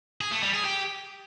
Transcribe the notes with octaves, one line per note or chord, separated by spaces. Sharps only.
G#4
A3
G3
G#4
G4